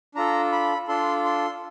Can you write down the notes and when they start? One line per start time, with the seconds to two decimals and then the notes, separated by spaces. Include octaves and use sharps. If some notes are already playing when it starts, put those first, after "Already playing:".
0.15 D4 F4 A4 A#5
0.52 B5
0.88 D4 F4 A4 C6
1.25 C6